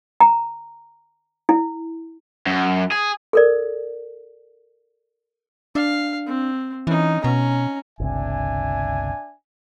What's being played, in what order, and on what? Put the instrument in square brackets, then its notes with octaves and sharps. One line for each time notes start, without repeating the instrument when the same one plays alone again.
[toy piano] A#5
E4
[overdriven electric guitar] F#2
G#4
[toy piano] A4 A#4 D5
[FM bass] D4 [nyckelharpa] F5
[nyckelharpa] C4
[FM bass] E3 [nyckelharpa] C#4 D#4
[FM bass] B2 [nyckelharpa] C#4 A#5
[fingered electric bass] G1 C#2 C3 [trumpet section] D4 E5 G#5